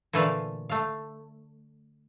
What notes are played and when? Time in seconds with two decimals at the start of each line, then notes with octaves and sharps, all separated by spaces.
0.13 A#2 D3 E3 A3 B4 F5
0.69 A3 F5